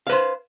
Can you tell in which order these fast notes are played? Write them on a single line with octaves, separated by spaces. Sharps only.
F5 B4 C5